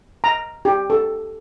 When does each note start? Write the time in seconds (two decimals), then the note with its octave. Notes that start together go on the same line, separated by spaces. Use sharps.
0.24 A#5
0.65 G4
0.90 A4